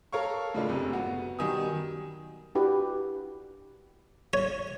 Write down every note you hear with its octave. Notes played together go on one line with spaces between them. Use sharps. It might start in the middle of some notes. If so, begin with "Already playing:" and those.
A4 A#4 C#5 F5 C#6
A2 C#3 G#3 A3 D4 F4
F#1 C3
B3 F#4
F#2 B2 D#3 G3 G#5 D#6
D4 E4 F#4 G4 B4
C#5